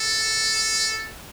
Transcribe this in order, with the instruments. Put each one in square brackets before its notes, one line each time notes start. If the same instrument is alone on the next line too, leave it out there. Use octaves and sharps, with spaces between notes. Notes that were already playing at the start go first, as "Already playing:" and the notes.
Already playing: [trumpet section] A4